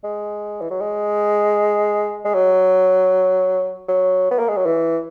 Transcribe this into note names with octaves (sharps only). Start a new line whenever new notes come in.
G#3
E3
F#3
G#3
G#3
F#3
F#3
B3
A#3
G#3
F#3
E3